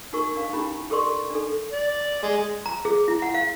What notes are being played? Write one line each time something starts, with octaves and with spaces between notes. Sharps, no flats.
D#4 F#4 A#4 C#6
D4 A#4 F5
C#4 D#4 E4 G4 A#5 B5
G4 A4 A#4 D5 C6 C#6
D4 D#4 A4
D5
G#3
A#5
G#4
E4
F#5
F5